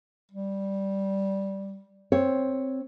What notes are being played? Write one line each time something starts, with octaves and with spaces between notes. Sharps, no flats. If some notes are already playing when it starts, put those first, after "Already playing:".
G3
C4 C#5